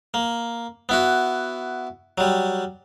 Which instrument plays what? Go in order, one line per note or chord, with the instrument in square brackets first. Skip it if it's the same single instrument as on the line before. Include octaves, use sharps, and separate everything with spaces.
[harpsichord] A#3
B3 E4 F#4
F#3 G3